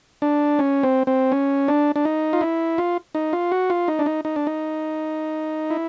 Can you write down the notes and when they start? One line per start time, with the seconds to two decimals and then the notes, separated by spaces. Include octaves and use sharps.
0.22 D4
0.59 C#4
0.83 C4
1.07 C4
1.32 C#4
1.68 D4
1.96 D4
2.05 D#4
2.33 F4
2.41 E4
2.78 F4
3.15 D#4
3.33 F4
3.52 F#4
3.70 F4
3.88 D#4
3.99 D4
4.06 D#4
4.25 D#4
4.36 D4
4.47 D#4
5.70 E4